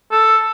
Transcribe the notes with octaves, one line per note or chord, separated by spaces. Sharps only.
A4